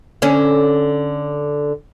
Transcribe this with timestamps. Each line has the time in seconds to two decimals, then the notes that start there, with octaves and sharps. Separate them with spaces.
0.22 D3 C#4